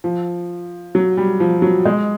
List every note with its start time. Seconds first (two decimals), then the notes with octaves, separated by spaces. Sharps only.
0.04 F3
0.95 F#3
1.17 G3
1.40 F3
1.62 F#3
1.85 G#3